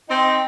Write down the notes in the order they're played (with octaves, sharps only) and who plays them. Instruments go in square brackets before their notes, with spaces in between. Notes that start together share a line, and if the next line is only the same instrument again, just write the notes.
[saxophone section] C4 D#4 [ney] G5